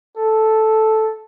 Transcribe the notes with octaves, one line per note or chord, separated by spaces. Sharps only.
A4